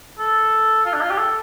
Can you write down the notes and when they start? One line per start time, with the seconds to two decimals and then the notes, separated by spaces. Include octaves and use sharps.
0.19 A4
0.85 F4
0.93 D4
1.01 F4
1.10 G4
1.18 A4